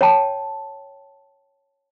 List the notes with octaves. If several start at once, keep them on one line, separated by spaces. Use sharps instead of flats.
C#5 G5 A5